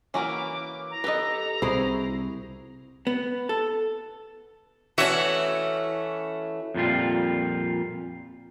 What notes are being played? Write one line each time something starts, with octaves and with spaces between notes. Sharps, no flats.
E3 A#3 C#4 F#4 A#4 D6
A#5
G4 A4 B4 D#5
C2 C3 E4 F#4 G#4 C5
B3
A4
E3 A3 C#4 F#4 E5
F2 A#2 G3 F4